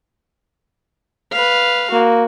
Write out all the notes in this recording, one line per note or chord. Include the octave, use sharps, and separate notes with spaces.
B4 F5
A#3 F#4